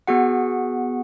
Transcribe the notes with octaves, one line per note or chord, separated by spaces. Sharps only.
B3 F#4 G#4 F#5